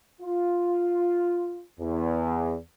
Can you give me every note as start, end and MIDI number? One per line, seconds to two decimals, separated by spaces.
0.21 1.63 65
1.79 2.57 40